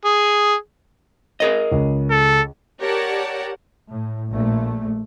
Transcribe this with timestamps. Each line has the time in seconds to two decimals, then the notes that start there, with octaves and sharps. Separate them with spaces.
0.05 G#4
1.40 G#4 A#4 D#5
1.71 C#2
2.10 A4
2.79 G4 A#4 C#5 D5 F#5 A5
3.90 A2
4.30 A#1 A#2 A3